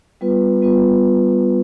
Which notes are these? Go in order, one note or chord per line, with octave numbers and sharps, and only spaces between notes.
G3 B3 F4 B4
G3 B3 F4 B4